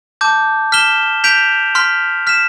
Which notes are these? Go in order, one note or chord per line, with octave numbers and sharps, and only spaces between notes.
A5 D6 G6
F6 B6 E7 G7
G6 B6 D7 F7
C6 F6 B6
F6 B6 E7